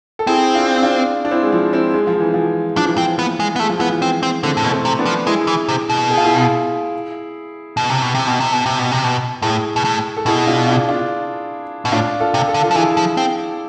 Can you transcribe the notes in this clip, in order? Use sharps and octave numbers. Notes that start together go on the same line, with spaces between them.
A4
C4 E4 G#4
D4 F4
D4 F4
D4
C4 E4
G#3
F3
C4 E4
G#3
F3
E3
F3
F3 D4
E3
F3 C4
B3
G#3
B3
G#3 A3
F3
E3 B3
F3
C4
C4
D3 A3 C4
A2
B2
A3 C4
C3
B3 D4
F3
G#3 E4 G#4
E3
C3
B2
G#4
F4
E4 G#4
B2
C3
B2
C3
B2
C3
B2
C3
B2
C3
B2
A2 E4 G#4
B2
A2
A4
B2 E4 G#4
D4 F4
D4 F4
D4 F4
B2
A2 D4 F4
F4 A4
C3
A4
D3
F4 A4
F3
E3 E4 G#4
F3
C4